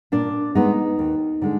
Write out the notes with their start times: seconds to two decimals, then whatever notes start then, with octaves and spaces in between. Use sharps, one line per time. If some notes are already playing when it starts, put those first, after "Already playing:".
0.12 A#2 D4
0.55 G#3 B3 D#4
0.99 D#2
1.42 D3 G#3